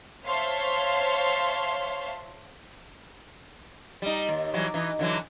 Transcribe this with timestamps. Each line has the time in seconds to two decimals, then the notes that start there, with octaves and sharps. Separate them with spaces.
0.25 C5 C#5 E5 F5 A5 C6
4.02 G3 D#4
4.29 D#2
4.54 E3 F#3 G3
4.74 E3 D#4
4.99 D3 E3 F#3